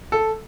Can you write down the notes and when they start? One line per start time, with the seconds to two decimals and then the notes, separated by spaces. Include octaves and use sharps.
0.12 A4